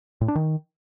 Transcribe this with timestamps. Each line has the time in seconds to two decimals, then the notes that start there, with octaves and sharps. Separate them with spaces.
0.21 A2
0.28 D4
0.35 D#3